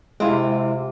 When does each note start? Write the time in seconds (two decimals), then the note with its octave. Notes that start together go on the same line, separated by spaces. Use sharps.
0.20 C3 G#3 C4 E4 F4